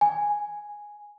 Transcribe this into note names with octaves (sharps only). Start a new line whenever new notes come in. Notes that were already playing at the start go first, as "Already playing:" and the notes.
G#5